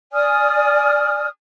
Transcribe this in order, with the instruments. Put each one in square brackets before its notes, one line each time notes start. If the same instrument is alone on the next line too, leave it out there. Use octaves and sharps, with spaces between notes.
[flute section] D5 G#5 D#6 F6